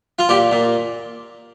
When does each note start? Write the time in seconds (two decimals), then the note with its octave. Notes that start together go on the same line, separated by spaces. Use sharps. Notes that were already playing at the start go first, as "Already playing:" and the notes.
0.19 F4
0.29 A#2 G4
0.51 A#2